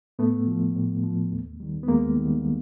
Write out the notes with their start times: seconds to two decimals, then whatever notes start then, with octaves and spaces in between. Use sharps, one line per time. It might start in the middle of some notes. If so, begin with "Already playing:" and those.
0.19 A2 A3 B3
0.47 F3
0.75 A2
1.03 F3
1.32 D#2
1.60 D#3 G3
1.83 B3
1.88 D#2 G#3 A#3
2.16 D#3 G3